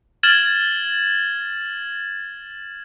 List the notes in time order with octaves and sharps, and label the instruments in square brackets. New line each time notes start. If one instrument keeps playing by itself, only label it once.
[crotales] F6 G#6 A6 E7 F#7